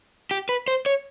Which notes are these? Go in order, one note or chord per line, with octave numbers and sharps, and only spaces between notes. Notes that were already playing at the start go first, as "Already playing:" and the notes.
G4
B4
C5
C#5